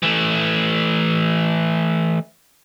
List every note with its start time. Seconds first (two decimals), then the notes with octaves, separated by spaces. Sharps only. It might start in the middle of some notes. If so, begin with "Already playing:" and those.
0.03 E3 A3